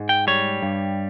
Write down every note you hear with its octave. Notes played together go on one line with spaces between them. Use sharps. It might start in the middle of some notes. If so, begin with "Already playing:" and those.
Already playing: G#2 G#3
G5
G3 C#5
G2